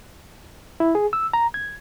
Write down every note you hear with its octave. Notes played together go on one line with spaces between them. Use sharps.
E4
G#4
E6
A#5
G#6